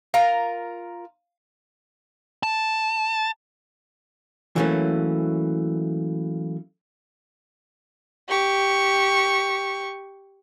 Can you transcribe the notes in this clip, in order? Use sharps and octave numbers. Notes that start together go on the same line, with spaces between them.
F4 A#4 F5 A#5
A5
E3 F#3 A3 A#3 C#4
G4 C#6